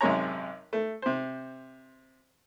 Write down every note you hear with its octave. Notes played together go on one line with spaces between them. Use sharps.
G#1 F#2 C3 G#3 C#5 A#5
A3
C3 C5